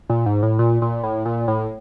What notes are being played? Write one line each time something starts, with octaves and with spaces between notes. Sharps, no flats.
A#2
G#2
A2
A#2
A#2
A2
A#2
A2